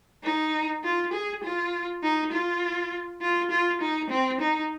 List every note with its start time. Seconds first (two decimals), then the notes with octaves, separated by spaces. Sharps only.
0.24 D#4
0.84 F4
1.13 G#4
1.43 F4
2.03 D#4
2.32 F4
3.21 F4
3.51 F4
3.81 D#4
4.10 C4
4.41 D#4